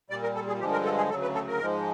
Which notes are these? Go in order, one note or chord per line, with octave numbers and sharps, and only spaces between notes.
A#2 G3 D5
A#4
A4
G#4
G2 D3 F3 G#3 G4
A#4
A4
G#4
D2 C#3 F#3 A4
B4
A4
A#4
G#2 F3 G#3